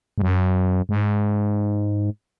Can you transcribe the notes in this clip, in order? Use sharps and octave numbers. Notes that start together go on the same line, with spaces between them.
G#2
F#2
G#2